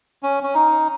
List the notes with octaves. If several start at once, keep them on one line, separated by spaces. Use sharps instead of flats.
C#4
C#4
D#4